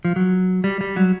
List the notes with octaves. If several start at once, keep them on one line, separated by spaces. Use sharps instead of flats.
F3
F#3
G3
G3
F#3